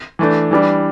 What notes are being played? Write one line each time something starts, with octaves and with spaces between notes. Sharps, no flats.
E3 A3 D4
E3 G3 D4